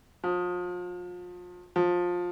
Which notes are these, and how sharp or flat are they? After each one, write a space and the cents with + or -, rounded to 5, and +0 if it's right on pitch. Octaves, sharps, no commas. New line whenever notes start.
F3 +35
F3 +20